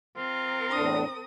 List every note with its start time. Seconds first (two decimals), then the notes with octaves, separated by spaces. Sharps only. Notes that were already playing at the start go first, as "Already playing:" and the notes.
0.16 C4 F4 A#4
0.71 E2 A2 D4 D#6